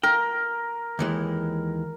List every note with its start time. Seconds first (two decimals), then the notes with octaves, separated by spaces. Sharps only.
0.03 A#4 G5
0.99 D#2 E3 G#3